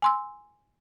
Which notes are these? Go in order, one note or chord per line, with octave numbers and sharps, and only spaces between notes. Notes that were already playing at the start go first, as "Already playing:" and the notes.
G#5 C6 E6